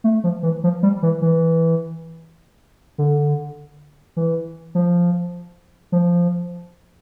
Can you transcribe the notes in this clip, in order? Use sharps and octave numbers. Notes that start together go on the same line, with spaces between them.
A3
F3
E3
F3
G3
E3
E3
D3
E3
F3
F3